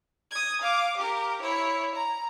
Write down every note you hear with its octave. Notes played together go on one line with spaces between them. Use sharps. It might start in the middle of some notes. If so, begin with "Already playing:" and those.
D#6 G#6
F5 D6
G4 A#4
E4 C#5
A#5